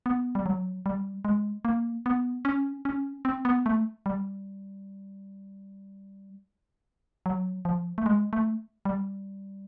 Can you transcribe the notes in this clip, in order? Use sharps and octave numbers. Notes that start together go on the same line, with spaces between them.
B3
G3
F#3
G3
G#3
A#3
B3
C#4
C#4
C4
B3
A3
G3
F#3
F3
A3
G#3
A3
G3